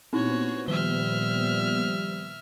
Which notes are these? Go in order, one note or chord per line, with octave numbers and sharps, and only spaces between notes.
A#2 B3 C4 D#4 E4 F#4 C5 C#5
D#3 F3 G3 E5 F6 G7